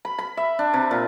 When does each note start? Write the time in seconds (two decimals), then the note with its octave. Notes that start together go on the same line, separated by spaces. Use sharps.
0.05 B5
0.18 B5
0.37 E5
0.59 D4
0.73 C3
0.91 A#2